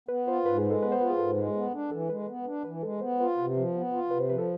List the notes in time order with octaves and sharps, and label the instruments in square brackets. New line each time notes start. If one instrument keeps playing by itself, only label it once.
[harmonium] B3 [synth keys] B4
[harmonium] F4 [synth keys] C5
[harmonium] G#2 [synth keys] B4
[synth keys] G#4
[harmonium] G#3
[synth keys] A4
[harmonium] B3 [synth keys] B4
[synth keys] C5
[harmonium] F4 [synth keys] B4
[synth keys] G#4
[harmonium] G#2 [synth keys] A4
[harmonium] G#3
B3
D4
[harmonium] E3 [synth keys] A4
[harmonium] G#3 [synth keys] B4
[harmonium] B3
D4
[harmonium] E3 [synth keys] B4
[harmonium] G#3 [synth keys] A4
[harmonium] B3 [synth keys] C5
[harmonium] F4 [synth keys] B4
[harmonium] C3 [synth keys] B4
[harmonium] F3
B3
F4
[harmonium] C3 [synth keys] B4
[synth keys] C5
[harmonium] F3 [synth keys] B4
[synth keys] A4